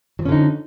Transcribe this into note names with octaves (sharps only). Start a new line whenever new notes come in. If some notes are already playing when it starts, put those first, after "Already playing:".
D3 F3 F#3 C#4 D#4